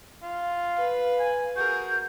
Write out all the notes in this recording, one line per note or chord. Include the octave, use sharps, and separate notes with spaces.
F4
B4 F5
G#5
F#4 G#4 A#4 G6